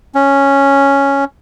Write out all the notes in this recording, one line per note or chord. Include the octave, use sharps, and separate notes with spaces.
C#4